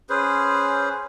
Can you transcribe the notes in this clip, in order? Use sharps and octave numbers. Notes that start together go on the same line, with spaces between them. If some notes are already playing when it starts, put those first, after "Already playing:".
C#4 G#4 B4 C5